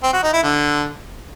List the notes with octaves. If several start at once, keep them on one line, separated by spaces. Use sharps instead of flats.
C4
F#4
D#4
E4
D3